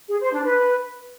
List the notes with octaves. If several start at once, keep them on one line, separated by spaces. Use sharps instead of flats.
G#4
C5
D4
B4